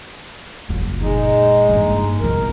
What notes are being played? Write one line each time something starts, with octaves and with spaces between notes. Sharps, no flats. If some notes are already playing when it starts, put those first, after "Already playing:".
F#1 F#2
A#2 G#3 D#4
G2 A#3
B1 F#2 A#4